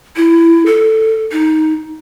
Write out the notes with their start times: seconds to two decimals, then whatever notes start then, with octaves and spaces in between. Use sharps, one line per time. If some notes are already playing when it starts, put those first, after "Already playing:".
0.16 E4
0.66 A4
1.32 D#4